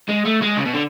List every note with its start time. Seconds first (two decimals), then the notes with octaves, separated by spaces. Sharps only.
0.08 G#3
0.25 A3
0.42 G#3
0.57 C#3
0.65 B2
0.74 D3